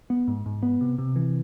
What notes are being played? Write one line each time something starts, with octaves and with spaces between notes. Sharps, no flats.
B3
G#2
G#2
B3
C3
C3
E3